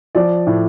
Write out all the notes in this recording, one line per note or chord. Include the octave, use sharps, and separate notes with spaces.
F3 D5
A2